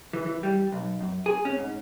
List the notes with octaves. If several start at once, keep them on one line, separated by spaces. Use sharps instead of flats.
E3
E3
G3
B1
F#2
G#4
C#4
G#2